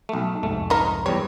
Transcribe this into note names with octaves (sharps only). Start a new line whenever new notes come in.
B1 A3
C2 F2 G#2 A3
D#4 A#4
E2 G3 C#5